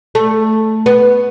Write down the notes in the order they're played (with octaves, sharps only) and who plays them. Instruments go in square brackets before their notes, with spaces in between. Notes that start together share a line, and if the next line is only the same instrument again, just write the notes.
[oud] A3
B3